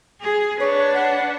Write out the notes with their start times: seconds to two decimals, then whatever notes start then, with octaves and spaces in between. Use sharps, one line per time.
0.21 G#4
0.60 D4 B4 C#5
0.95 F#5